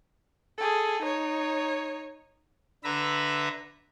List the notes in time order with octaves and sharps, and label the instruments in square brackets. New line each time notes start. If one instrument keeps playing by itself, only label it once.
[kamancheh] G#4 A4
D#4 C#5
[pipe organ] D3 B4 E5 A#5 B5